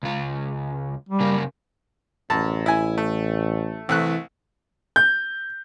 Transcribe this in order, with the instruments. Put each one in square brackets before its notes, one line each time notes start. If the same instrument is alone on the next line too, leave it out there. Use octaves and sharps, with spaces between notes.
[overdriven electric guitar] C#2 F4
[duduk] G3
[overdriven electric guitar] C#3 A#3
[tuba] A1 [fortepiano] F#2 A5
[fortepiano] E4 G#5
A3
[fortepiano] C2 A3 F#6 [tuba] E3
[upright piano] G6